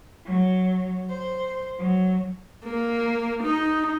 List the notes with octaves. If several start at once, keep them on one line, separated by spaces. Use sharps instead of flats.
F#3
C5
F#3
A#3
D#4